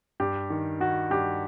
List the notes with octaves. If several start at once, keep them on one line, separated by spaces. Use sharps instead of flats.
G2 G4
D#3
D#3 F#4
G2 G4